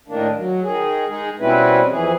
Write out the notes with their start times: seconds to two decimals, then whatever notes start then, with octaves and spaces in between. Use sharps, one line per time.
0.08 A2 D#3 A#3 D4
0.37 F#3
0.63 D#3 G#4
1.09 G#3 D#4 G#4
1.40 B2 G3 C4 C#4 E4 B4
1.89 F2 E3 G#4